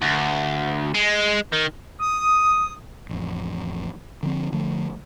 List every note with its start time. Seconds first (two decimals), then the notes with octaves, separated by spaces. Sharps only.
0.01 D2
0.94 G#3
1.52 D#3
2.01 D#6
3.09 A1 F2
4.23 D3 F3 C4
4.52 D3 F3 A3